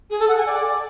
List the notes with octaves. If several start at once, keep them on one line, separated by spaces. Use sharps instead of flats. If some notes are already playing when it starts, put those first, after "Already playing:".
G#4
A4
F#5
G#5
D5